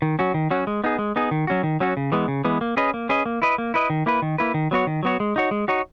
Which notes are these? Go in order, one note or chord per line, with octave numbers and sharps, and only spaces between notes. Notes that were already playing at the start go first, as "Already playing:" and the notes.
D#3
F#3 C#4 F#4
D#3
F#3 C#4 F#4
G#3
B3 D#4 G#4
G#3
B3 D#4 G#4
D#3
F#3 C#4 F#4
D#3
F#3 C#4 F#4
C#3
E3 G#3 B3
C#3
E3 G#3 B3
A#3
C#4 G#4 B4 D#5
A#3
C#4 G#4 B4 D#5
A#3
E4 B4 D#5
A#3
E4 B4 D#5
D#3
A#3 E4 B4
D#3
A#3 E4 B4
D#3
F#3 B3 F#4 C#5
D#3
F#3 B3 F#4 C#5
G#3
D#4 F#4 C#5
G#3
D#4 F#4 C#5